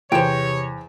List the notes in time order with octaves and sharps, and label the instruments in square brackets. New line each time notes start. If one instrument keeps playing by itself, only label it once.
[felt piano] E2 [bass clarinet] C3 [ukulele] C5 G5 [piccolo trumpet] C#5